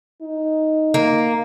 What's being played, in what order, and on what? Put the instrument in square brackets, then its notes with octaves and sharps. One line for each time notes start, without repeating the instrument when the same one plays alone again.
[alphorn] D#4
[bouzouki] A#3